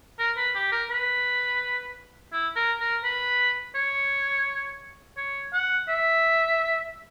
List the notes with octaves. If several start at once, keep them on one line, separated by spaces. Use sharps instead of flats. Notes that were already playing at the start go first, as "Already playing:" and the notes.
A#4
B4
G4
A#4
B4
E4
A#4
A#4
B4
C#5
C#5
F#5
E5